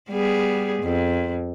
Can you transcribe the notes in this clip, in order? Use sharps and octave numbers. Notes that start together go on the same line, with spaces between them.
G3 B3 G#4
F2